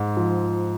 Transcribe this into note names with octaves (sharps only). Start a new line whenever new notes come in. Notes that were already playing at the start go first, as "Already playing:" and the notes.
Already playing: G#2
F3